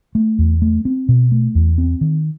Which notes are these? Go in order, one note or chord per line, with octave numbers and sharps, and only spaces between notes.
A3
E2
A3
C4
B2
A3
E2
C4
D#3